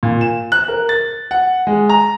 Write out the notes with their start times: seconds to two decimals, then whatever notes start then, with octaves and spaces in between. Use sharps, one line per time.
0.03 A#2
0.21 E7
0.52 F#6
0.68 A#4
0.89 A6
1.31 F#5
1.67 G#3
1.89 A#5